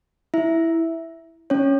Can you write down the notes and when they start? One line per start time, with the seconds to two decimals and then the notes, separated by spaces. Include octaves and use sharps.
0.34 E4 E5
1.50 C#4 C#5